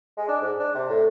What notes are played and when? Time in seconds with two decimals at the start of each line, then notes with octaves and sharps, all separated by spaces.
0.17 G#3
0.29 D4
0.41 G#2
0.60 D4
0.75 C3
0.89 A2